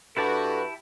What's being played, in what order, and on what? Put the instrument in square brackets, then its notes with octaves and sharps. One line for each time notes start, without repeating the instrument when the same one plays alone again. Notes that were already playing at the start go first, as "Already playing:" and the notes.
[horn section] G2 F#4 [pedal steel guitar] E4 G4 A5 [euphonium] A4 [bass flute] B4